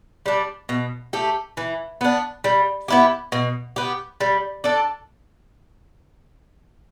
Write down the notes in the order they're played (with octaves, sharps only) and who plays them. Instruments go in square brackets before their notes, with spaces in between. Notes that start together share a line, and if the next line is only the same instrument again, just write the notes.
[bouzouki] G3 D4
B2
A3 G4
E3
B3 D4
G3
B3 E4 G4
B2
B3 G4
G3
D4 A4